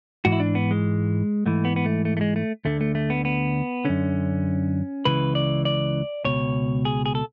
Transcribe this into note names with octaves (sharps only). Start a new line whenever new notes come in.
G#2 E3 F#4
E4
D4
B3
G#3
G#2 E3 A3
B3
B3
A3
A3
A3
G#3
A3
D2 D3 A3
A3
A3
B3
B3
F#2 D3 C#4
C#2 C#3 E3 B4
D5
D5
C#2 B2 C#5
G#4
G#4
A4